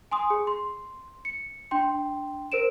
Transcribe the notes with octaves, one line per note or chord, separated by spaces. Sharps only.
G#5 C6 D#6
G#4
C6
C#7
D4 G5 C6
A#4 C5 D7 E7